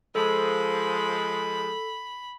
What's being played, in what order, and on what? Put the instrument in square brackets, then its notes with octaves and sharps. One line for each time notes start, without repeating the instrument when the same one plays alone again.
[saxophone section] F3 G#3 [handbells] A4 [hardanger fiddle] B5